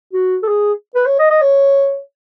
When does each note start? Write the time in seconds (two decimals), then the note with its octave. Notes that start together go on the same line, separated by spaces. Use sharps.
0.13 F#4
0.43 A4
0.48 G#4
0.95 B4
1.06 C#5
1.19 D#5
1.30 D#5
1.42 C#5